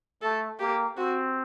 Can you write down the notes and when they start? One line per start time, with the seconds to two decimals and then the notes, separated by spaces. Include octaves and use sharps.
0.22 A3 A4
0.60 A#3 G4
0.97 C4 F#4